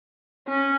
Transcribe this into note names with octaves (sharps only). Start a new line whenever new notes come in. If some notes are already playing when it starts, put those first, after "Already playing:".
C#4